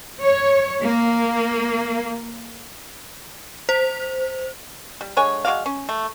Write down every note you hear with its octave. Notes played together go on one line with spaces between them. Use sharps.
C#5
A#3
C5
G3
D3 G#3 C#5 G#5
G#3 F#4 D5 F5
C#4
A3